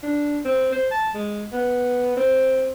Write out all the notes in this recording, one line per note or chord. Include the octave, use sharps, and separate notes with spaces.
D4
C4
C5
A5
G#3
B3
C4